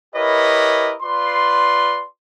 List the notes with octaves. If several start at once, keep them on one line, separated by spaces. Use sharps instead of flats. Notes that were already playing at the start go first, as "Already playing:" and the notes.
E4 G4 A#4 B4 C#5 D#5
F4 B4 D5 C6